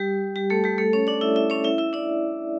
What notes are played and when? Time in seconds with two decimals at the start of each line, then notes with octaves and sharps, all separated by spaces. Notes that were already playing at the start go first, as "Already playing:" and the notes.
Already playing: G3 G4
0.36 G3 G4
0.50 A3 A4
0.64 G3 G4
0.78 A3 A4
0.93 C#4 C#5
1.07 D4 D5
1.21 E4 E5
1.36 E4 E5
1.50 C#4 C#5
1.64 E4 E5
1.78 E4 E5
1.93 D4 D5